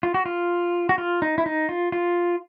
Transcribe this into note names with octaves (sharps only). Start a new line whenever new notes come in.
F4
F#4
F4
F#4
F4
D#4
E4
D#4
F4
F4